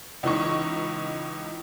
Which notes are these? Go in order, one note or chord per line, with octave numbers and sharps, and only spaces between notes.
C#2 E3 D#4 C#6